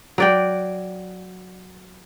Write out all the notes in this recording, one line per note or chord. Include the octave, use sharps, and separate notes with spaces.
F#3 D5 G5